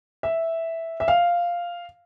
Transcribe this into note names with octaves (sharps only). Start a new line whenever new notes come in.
E5
E5
F5